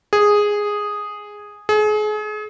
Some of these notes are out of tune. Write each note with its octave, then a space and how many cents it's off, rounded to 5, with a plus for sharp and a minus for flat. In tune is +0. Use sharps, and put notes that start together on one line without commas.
G#4 -5
G#4 +35